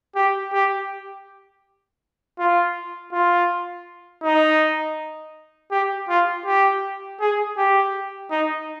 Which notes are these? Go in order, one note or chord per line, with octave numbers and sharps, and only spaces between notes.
G4
G4
F4
F4
D#4
G4
F4
G4
G#4
G4
D#4